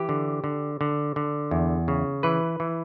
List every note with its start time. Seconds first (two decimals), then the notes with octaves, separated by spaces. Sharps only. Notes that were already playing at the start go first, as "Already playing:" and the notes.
Already playing: E3 G4
0.09 D3
0.44 D3
0.81 D3
1.16 D3
1.51 E2
1.88 C#3
2.23 E3 B4
2.60 E3